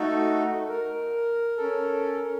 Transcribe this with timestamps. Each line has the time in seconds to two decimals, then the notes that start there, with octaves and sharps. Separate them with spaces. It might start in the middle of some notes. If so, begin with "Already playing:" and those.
Already playing: A3 D#4 F#4 A4
0.69 A#4
1.58 C#4 A4